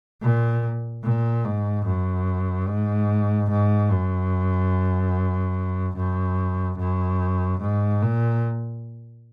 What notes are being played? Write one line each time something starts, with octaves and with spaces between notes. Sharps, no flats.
A#2
A#2
G#2
F#2
G#2
G#2
F#2
F#2
F#2
G#2
A#2